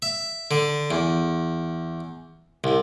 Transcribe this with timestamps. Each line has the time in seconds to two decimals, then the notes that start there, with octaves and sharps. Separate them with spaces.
0.02 E5
0.51 D3
0.91 E2
2.64 C2